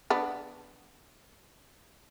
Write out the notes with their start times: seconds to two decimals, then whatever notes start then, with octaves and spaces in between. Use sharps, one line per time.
0.10 B3 D4